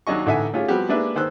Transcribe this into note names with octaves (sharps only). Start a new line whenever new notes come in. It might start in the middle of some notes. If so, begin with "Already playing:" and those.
D#2 F#3 D4 D#5 C#6
A1 D3 D#4 E5 F#5 G#5
A3 C#4 F4 G4 G#4
F3 G3 B3 C4 F#4 G4
G#3 A#3 D4 G4 B4 E5
D#3 C5 E6 F#6